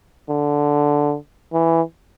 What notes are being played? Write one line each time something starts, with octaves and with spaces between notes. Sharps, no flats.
D3
E3